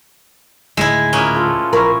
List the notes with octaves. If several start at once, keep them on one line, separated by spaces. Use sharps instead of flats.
D2 A2 D#3 G#3 E4 E5
A#2 B3 C#4 A#4
F4 A4
A#1 E4 A#4 C#6